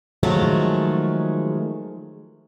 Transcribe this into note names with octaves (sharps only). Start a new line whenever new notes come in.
D#3 F3 F#3 G#3 A3 G#4